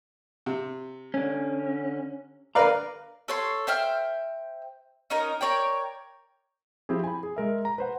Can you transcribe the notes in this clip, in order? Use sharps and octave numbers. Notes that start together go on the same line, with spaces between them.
C3
D3 C#4
D3 A#4 B4 D5 F5 A#5
A4 C#5 C6
C5 E5 G5 F6
C#4 D#4 A#4
A#4 C#5 D5 G5
F3 C4 E4 G4 G#4
G#5 B5
G#4
G#3 A#4 E5
A#5
B4 C5 F#5